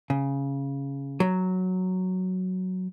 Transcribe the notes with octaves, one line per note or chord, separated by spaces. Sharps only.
C#3
F#3